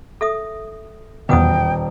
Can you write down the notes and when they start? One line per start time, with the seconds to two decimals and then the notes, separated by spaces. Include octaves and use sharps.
0.21 A4 E5 D#6
1.29 D#1 E2 B2 B4 F#5 G5 D#6